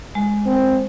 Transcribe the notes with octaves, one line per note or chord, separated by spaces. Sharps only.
G#3
C4